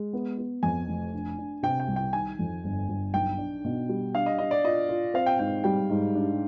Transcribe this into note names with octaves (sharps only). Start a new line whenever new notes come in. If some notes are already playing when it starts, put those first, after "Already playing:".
Already playing: G#3
B3
B3
F2 G#5
F1
D4
D4
C3 G5
G5
C2
G5
D#3 G#5
F2
G1
G1
B1 G5
D4
B2
G3
D4 F5
D#5
D4 D#5
D5
F4 D#5
F4
C4 F5
G5
G#2 G5
G3 G5
G#2
D4